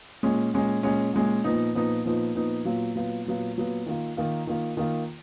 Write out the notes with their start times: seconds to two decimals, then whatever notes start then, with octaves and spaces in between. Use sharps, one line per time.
0.23 A#2 G#3 C#4
0.54 A#2 G#3 C#4
0.83 A#2 G#3 C#4
1.13 A#2 G#3 C#4
1.44 A#2 F3 B3 D#4
1.75 A#2 F3 B3 D#4
2.04 A#2 F3 B3 D#4
2.35 A#2 F3 B3 D#4
2.65 A#2 F#3 B3 F4
2.96 A#2 F#3 B3 F4
3.25 A#2 F#3 B3 F4
3.57 A#2 F#3 B3 F4
3.86 D#3 A#3 F4
4.17 D#3 A#3 F4
4.47 D#3 A#3 F4
4.77 D#3 A#3 F4